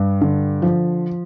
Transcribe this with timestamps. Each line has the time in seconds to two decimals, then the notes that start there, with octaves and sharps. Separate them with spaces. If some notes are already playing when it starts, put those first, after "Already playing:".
Already playing: G2
0.21 D3
0.62 F3